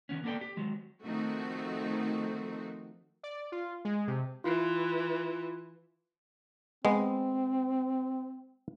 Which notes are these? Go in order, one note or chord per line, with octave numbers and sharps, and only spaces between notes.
D#3 F3 B3 C#4
A#3 B3 A4 C5 D5 G5
G4
D#3 F#3 G#3
D#3 F3 A3 C4 F#4
D5
F4
G#3
C3
E3 E4 F4
G#3 B3 C4